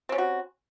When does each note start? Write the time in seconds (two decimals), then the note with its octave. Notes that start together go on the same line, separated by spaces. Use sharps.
0.09 C4
0.12 C#4
0.15 G3
0.18 F#4